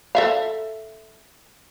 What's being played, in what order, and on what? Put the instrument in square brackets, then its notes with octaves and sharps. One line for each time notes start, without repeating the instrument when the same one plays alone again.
[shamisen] A4 E5 F5